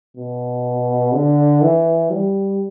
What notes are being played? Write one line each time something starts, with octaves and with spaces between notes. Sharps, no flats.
B2
D3
E3
G3